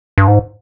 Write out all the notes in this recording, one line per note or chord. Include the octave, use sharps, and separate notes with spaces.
G2
G#2